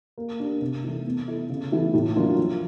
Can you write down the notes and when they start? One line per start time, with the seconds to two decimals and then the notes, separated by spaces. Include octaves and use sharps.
0.18 A#3
0.40 D4 G4
0.61 C3
0.84 E3 A3
1.05 B3
1.28 E4 A4
1.50 C#3
1.72 E3 A3
1.94 A2
2.16 F#3 A#3 D4 F4
2.37 F3